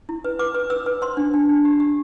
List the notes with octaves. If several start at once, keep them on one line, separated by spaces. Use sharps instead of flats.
E4
B4
B4 D6
B4
B4 E6
B4
C5 C6
D4
D4
D4
G4
G4